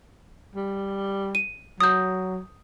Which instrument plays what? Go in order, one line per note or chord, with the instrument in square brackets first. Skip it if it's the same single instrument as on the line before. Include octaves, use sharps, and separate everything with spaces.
[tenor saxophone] G3
[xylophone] D#7
[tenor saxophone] F#3 [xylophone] D#6 G6